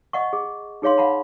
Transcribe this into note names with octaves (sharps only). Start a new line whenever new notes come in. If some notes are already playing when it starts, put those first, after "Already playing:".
D#5 F#5 C#6
G#4
D#4 G#4 C#5 F5 C6
F5 F#5 A5 B5